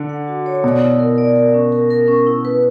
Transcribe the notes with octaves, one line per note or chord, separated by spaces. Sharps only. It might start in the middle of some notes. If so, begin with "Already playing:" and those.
Already playing: D3
F#5
F#4
C#5
B2 D5
E4
A#4
D5
A#4
C#4
A#4
A#4
C#4
E4
B4